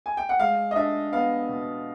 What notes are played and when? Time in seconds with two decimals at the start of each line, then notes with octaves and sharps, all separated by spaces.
0.06 G#5
0.17 G5
0.29 F#5
0.39 G#3 F5
0.71 D#5
0.76 D4 E5
1.12 B3 F5
1.49 B2